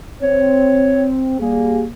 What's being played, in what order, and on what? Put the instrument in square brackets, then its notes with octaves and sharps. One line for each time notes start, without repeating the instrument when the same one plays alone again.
[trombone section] C4 [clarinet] C#5
[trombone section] G3 G#4 [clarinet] A#3